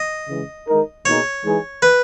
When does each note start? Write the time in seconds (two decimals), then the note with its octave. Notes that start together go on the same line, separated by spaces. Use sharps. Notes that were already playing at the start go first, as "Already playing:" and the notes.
Already playing: D#5
0.29 C#3 E3 G#3
0.68 D#3 G#3 D#4 A#4
1.05 B2 A#3 D#4 G#4 C#5
1.44 E3 G#3 D#4 G#4 B4
1.82 B4